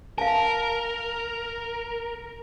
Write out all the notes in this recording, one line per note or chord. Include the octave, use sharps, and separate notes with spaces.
A#4 F5 A5